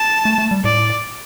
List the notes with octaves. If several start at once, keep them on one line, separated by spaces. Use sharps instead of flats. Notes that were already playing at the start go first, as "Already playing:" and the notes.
Already playing: A5
A3
A3
G3
A2 D5